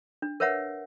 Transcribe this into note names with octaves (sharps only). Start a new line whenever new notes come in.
D4
A#4 B4 C#5 E5 F#5